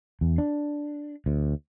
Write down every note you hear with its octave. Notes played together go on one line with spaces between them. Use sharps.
E2
D4
D2